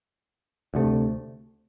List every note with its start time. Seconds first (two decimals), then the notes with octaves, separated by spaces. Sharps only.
0.74 D2 C3 A3